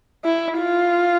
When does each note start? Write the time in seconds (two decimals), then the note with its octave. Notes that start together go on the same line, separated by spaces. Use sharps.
0.24 E4
0.59 F4